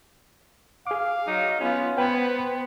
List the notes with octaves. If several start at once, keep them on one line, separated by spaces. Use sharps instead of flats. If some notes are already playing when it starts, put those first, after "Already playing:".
G#4 F5 D6
F#3 D#4
B3 C#4 F4
B3 B4 C5 G5 B5 G#6